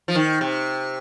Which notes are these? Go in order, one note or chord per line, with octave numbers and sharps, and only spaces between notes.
F3
D#3
C3